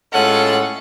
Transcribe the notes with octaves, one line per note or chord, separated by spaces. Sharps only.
A2 G#3 C#4 F4 A4 F#5